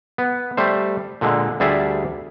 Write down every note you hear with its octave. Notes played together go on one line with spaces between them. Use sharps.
B3
G3 A3 C5
A#2 D3 G#3
D2 G3 G#4 D5 E5